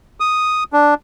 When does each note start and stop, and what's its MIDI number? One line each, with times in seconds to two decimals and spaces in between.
0.20 0.64 87
0.73 0.94 62